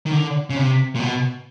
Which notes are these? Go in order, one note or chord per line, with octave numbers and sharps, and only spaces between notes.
D#3
D3
C#3
C3
A#2
B2